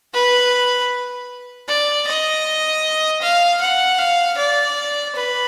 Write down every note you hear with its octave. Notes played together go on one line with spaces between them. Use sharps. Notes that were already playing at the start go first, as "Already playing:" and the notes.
B4
D5
D#5
F5
F#5
F5
D5
B4